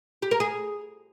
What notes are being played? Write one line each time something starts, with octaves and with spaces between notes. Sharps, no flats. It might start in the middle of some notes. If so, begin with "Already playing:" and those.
G4
A#4
G#4